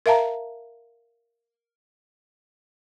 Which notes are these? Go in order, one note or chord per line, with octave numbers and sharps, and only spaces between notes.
A#4 E5 F5 A5 A#5